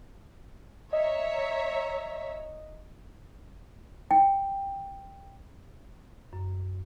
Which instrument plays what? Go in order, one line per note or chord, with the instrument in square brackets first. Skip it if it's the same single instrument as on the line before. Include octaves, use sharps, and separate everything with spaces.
[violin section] C#5 E5 A#5 [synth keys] D#5
[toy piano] G5
[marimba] F#2